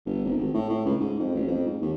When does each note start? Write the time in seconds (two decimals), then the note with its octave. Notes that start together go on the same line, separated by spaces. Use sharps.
0.06 G1
0.24 F1
0.37 G#1
0.54 A2
0.69 A2
0.85 C#2
1.00 G#2
1.19 F2
1.35 A1
1.47 F2
1.66 G#2
1.82 D#2